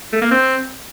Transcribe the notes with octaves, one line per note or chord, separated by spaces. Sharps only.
A3
A#3
C4